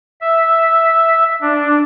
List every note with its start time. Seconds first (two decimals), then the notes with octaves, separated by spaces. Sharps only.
0.21 E5
1.41 D4